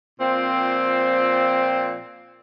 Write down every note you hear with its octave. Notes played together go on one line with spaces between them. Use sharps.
A#2 F3 C4